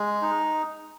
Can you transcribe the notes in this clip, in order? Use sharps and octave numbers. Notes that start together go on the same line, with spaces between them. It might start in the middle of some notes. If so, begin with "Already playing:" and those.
Already playing: G#3
D#4